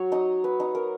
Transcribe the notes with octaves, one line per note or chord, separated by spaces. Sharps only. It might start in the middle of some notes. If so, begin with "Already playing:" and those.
Already playing: F#3 C#5
D#4 D#5
B4
D#4
A#4